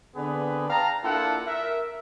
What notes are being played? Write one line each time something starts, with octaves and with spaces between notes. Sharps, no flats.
D3 B3 C4 G#4 B4 D5
F5 G5 A5 A#5
A#3 D4 E4 F4 A4 F#5
A#4 E5